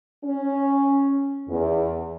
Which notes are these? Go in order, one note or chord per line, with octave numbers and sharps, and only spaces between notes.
C#4
E2